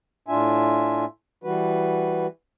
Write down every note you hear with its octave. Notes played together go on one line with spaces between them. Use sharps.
A2 D4 F4 E5 G#5
E3 G3 F#4 B4